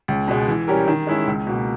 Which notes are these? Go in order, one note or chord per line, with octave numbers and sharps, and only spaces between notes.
C#2
B2 G#3
E3
G3 C#4 G4 A#4
D#3
G#3 C#4 E4
C#2
B2 A#3